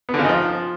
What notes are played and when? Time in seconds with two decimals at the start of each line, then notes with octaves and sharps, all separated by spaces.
0.09 B3
0.14 D3
0.19 C#3
0.24 D#4
0.29 F3